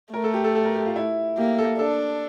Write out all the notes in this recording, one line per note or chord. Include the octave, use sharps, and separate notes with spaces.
A3 A#4
A4
G4
A4
A4
A#4
G4
F4
E4
A#3 G4
A4
D4 A4